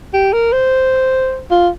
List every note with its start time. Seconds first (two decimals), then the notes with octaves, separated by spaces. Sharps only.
0.13 G4
0.33 A#4
0.52 C5
1.51 F4